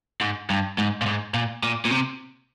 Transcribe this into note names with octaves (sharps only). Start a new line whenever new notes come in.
G#2
G2
G#2
A#2
G#2
A#2
A#2
A#2
C3